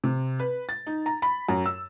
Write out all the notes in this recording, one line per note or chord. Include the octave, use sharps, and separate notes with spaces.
C3
B4
A6
D#4
A#5
B5
F#2
E6